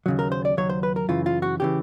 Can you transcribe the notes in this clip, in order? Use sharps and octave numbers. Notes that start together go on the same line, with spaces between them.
D#2 C#3 F#3
A#4
C5
D5
D#2 C#3 F#3 C#5
C5
B4
A#4
F#2 C#3 E3 F4
F4
F#4
C#3 E3 G4